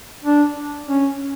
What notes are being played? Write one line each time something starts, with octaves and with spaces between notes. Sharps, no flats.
D4
C#4